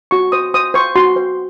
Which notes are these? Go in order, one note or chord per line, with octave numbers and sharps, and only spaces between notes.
F#4 C#6
C5 D#6
C5 D#6
C5 C#6
F#4 C6
C5